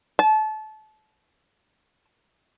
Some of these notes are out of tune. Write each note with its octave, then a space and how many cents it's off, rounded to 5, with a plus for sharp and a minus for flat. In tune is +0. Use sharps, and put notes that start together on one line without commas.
A5 -25